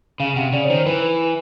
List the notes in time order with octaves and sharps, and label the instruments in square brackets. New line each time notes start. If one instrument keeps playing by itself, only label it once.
[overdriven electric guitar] C#3 [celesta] F5
[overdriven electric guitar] C3 [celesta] F#5
[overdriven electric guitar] C#3 [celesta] D5
[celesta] C#5
[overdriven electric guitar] D#3 [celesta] C5
[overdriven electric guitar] E3 [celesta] B4
[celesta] B4
B4